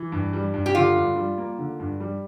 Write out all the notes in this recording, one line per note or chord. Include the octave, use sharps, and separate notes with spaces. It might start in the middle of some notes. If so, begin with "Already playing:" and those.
Already playing: E3
G2
G3
G2
G4
D3 F4
G2
G3
A#3
D3
G2
G3